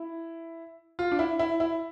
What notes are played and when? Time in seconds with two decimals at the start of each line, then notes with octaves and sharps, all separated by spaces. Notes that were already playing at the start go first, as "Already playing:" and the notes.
Already playing: E4
0.99 F4
1.12 D4
1.19 E4
1.39 E4
1.60 E4